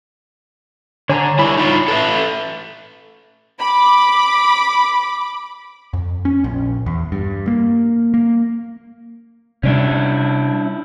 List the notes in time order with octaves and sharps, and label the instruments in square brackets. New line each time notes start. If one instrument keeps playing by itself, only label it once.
[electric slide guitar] D3 [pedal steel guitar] C#5 G#5 A#5
[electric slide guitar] G3 E4 [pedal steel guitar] B5 C#6
[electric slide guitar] D#4 F4 C#5
A4 B4 E5
[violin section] B5 D6
[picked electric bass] F2
C#4
A#1
E2
G2
A#3
A#3
[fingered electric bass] C3 G3 [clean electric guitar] C#4 D4 E4